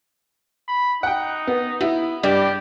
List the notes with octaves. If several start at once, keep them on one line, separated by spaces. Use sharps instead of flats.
B5
D#4 F#5 G5
B3
B3 E4
G2 G3 G4 D5